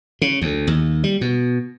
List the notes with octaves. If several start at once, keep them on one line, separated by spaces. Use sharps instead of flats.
C#3
D2
D#2
G3
B2